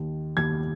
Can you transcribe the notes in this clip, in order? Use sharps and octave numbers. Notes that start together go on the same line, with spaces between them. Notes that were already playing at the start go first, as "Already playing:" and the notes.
Already playing: D#2 D#3
D#2 D#3 G#6